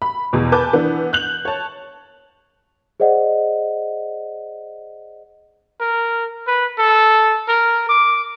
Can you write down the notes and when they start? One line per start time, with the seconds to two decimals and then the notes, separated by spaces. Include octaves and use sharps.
0.02 B5
0.33 E2 B2
0.52 B4 G#5 A5 D6 G6
0.73 E3 B3 D4
1.13 F#6 G6 F#7
1.45 C#5 A5
3.00 G#4 C5 D5 D#5 F#5
5.80 A#4
6.47 B4
6.78 A4
7.48 A#4
7.89 D6